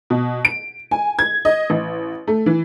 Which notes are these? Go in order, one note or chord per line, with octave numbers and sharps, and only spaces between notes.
B2
D7
G#5
G#6
D#5
A1
A3
E3